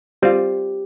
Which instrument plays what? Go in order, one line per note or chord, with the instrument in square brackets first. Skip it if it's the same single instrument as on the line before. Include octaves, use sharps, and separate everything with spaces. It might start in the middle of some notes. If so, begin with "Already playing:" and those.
[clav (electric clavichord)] G3 C4 F4 [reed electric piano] G4